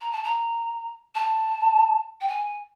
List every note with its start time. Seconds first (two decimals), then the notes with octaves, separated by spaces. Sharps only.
0.01 A#5
0.12 A5
0.24 A#5
1.15 A5
2.21 G5
2.28 G#5